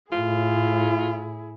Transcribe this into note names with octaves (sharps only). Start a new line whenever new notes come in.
A2 E4 F4 G#4